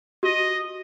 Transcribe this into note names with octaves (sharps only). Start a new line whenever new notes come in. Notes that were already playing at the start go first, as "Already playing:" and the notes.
F#4 D#5